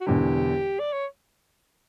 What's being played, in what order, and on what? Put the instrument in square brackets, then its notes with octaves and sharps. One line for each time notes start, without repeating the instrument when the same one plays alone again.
[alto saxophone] F#4
[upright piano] E1 E2 D3 [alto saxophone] G4
[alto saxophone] D5
C#5